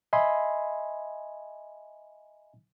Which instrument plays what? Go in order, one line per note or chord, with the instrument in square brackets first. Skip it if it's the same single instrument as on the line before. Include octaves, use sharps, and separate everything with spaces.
[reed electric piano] D#5 E5 G#5 B5 C6